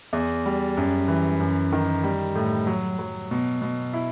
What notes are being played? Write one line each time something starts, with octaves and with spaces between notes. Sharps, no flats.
E2
G3
F#2
E3
F#2
D#3
G3
A2
F#3
F#3
B2
B2
E4